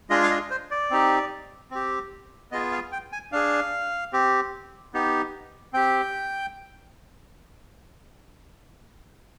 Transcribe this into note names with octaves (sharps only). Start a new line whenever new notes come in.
G#3 D4 F4 G#4 D#5
F5
D#5
C5
D5
C4 D#4 G4
C4 G4
B3 F4 G#4 D#5
F5
G5
G#5
D4 G#4 F5
C4 G4
B3 D#4 G4
C4 G4 G5